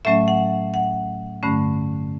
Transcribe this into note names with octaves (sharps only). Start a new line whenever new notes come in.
A2 F#3 A3 C#4 E5
F#5
F#5
G2 D3 A3 C#4